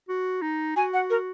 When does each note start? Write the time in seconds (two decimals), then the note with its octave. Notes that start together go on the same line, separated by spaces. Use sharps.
0.09 F#4
0.42 D#4
0.76 F#4 G#5
0.94 F#5
1.10 A#4